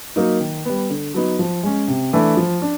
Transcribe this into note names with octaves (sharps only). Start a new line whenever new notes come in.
F#3 A#3 D#4
D#3
G3 B3
D3
F#3 B3 D#4
F3
G#3 C#4
C3
E3 A3 D4
F3
D4